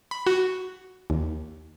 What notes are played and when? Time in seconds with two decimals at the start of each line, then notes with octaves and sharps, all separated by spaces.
0.11 B5
0.27 F#4
1.10 D#2